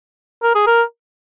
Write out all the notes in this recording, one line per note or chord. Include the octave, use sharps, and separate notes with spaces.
A#4
G#4
A#4